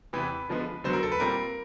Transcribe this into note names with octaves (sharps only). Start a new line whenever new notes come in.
E2 C3 E3 B4
D3 F3 G#3 B3
D3 F#3 B3 C5
A#4
A4
B4
A#2 G3 C4 A#4